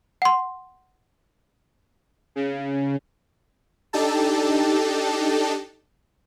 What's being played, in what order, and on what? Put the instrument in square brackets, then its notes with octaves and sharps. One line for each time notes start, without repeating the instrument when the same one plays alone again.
[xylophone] F#5 C6
[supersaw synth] C#3
D4 D#4 G4 A4 A5